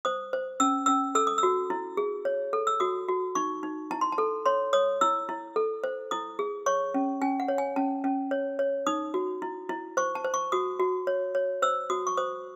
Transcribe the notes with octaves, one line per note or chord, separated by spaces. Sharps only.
C5 D#6
C5
C#4 E6
C#4 E6
A4 E6
D#6
E6
F#4
E4
G#4
C#5
A4
E6
F#4 D#6
F#4
D#4 C#6
D#4
E4 A5
C6
A5
A4
C#5 C6
C#5 D#6
E4 E6
E4
A4
C5
E4 D#6
G#4
C#5 C#6
C#4
C#4 G#5
F#5
C#5
G#5
C#4 A5
C#4
C#5
C#5
D#4 D#6
F#4
E4
E4
C5 C#6
A5
C5
C#6
F#4 D#6
F#4
C#5
C#5
C5 E6
F#4 D#6
C#6
C5 D#6